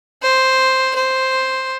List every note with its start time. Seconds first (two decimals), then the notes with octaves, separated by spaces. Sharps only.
0.23 C5
0.95 C5